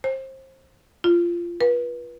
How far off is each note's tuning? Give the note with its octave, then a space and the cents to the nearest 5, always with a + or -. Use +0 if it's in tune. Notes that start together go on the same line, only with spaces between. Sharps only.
C5 +25
F4 -20
B4 -30